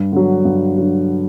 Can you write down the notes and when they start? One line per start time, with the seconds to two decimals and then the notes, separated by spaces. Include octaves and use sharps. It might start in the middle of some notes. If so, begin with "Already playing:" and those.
Already playing: G2
0.12 D3 F#3
0.45 G2
0.78 D3 F#3